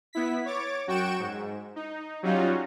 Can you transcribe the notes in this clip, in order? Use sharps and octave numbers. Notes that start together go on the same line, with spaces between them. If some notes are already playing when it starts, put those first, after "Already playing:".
B3 E4 B6
C#5 D6 A6
F#2 F#4 G5 C#6 D7 E7
G#2
D#4
F#3 G3 C#4 D#4 F4 F#4